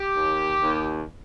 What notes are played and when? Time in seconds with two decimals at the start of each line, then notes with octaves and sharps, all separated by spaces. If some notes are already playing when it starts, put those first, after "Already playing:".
Already playing: G4
0.17 D#2
0.61 D#2